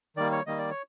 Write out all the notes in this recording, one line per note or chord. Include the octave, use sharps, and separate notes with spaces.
D#3 G3 A#3 D5
C#5
D#3 G3 A#3 D#5
D5
C#5